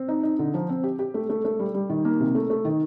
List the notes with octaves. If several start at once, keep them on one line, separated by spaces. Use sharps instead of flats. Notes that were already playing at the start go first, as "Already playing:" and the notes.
Already playing: C4
D#4
D#4
D3
F3
C4
G4
G4
A3
A3
A3
G3
G3
D#3
A#3
C3
A3
A3
D#3